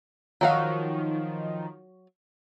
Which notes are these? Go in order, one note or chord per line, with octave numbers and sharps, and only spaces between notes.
D#3 F3 F#3 F#4 F5